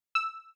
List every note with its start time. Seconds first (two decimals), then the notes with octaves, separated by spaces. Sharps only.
0.15 E6